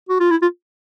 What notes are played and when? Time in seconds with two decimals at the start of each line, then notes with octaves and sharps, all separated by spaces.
0.09 F#4
0.20 F4
0.31 E4
0.42 F4